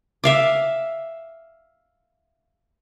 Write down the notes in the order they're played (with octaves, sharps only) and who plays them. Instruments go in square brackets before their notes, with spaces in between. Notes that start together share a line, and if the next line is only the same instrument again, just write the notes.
[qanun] E5 F5 D6